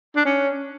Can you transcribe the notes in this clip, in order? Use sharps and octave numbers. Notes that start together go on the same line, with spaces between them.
D4
C#4